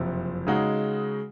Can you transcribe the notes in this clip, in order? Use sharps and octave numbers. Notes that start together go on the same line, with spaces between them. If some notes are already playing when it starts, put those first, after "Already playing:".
Already playing: F#1 F2 C3
C#3 G#3 D#4 F#4